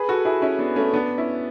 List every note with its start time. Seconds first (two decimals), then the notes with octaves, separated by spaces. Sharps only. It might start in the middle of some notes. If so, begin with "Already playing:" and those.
Already playing: G#4 B4
0.09 F#4 A4
0.25 E4 G#4
0.42 C#4 E4
0.59 B3 D4
0.76 A3 C#4
0.93 B3 D4
1.18 C#4 E4